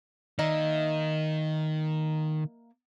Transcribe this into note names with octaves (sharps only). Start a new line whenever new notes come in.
D#3 A#3 D#5 E5